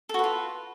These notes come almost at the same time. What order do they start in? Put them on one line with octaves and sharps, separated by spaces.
A4 F#4 B4 F4